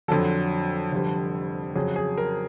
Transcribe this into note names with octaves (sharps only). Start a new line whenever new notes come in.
F2 D3 F#3 A4
F1 F2 D3 G3
F2 C#3 F#3 G#4
G#4
A#4